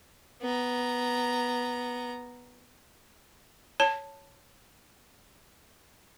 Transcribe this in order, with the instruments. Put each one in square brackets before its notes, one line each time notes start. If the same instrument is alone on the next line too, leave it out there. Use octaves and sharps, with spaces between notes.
[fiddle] B3 A#5
[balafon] C#5 A5